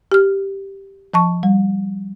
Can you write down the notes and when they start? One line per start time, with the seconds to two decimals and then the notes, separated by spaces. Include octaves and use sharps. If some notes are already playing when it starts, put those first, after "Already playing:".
0.12 G4 F6
1.14 F3 A5 C#6
1.43 G3